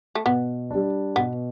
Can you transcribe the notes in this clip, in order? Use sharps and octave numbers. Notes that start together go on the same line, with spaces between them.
A3
B2 B3
G3 D4
B2 B3